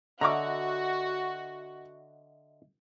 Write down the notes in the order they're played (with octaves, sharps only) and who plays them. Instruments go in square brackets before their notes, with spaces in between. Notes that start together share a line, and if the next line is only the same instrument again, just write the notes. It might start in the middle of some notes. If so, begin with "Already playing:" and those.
[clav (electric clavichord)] D3 [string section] F#4 [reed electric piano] D#5 E5 [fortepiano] A#5 C#6 D6